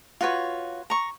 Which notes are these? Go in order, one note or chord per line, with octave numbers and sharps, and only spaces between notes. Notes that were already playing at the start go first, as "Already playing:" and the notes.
F4 F#4 B4 C#5
A#5 C#6